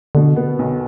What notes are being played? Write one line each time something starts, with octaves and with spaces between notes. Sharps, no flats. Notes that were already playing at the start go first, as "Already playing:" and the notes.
B2 D3
B3
B1